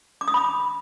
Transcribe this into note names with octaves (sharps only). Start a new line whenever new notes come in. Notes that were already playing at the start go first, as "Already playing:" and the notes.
D6
D#6
B5